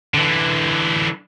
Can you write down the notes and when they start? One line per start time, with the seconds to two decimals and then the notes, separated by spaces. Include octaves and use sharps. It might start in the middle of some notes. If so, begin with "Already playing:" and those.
0.14 D3 E3